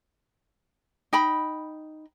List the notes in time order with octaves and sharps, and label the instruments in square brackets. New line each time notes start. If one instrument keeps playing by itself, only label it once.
[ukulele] D#4 G5 B5